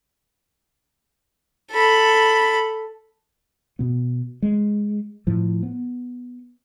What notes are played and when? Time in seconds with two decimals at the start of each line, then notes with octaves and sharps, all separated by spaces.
1.71 A4 B5
3.79 B2 B3
4.42 G#3
5.27 A2 F3
5.63 B3